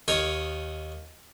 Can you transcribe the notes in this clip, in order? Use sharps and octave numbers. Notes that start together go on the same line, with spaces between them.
D#2 D#4 A#4 C#5